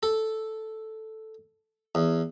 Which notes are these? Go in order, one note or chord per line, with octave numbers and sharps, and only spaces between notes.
A4
E2